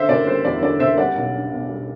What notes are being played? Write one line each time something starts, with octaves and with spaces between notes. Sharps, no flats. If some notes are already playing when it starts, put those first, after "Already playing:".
Already playing: D3 C5 E5
F#1 D5
G3 C5
E2 D5
D3 D5
F#1 C5 E5
G3 D5 F#5
B1
D4
B2
G3